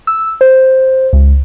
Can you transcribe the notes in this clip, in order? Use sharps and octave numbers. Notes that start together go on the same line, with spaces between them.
E6
C5
C#2